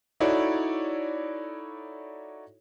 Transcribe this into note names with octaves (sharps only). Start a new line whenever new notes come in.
D#4 E4 F#4 A4 C#5 D5